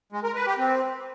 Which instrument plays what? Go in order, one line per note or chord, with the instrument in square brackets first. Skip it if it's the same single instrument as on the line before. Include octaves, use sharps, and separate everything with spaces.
[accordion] G#3
A#4
B4
G4
C4